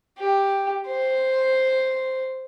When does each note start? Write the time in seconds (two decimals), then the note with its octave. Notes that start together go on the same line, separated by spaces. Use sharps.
0.19 G4
0.87 C5